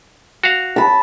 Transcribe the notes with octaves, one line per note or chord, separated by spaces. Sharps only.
F#4 F5
A5 B5